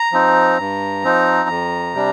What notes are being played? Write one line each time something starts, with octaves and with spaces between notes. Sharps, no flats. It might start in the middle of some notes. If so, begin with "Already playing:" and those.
Already playing: A#5
F3 C4 D#4
G2
F3 C4 D#4
F2
C3 G3 D4